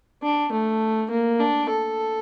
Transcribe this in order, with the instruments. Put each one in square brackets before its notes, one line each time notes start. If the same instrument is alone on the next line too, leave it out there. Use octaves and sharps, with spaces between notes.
[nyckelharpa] D4
A3
A#3
D4
A4